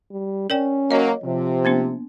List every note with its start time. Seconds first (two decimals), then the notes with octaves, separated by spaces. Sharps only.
0.11 G3
0.50 C#4 A#4 D5 G5
0.91 F#3 A#3 C#5 D#5
1.24 C3 F3
1.65 A#3 B3 D4